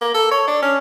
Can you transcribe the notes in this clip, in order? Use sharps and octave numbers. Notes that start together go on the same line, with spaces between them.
A#3
A4
C#5
D4
C#4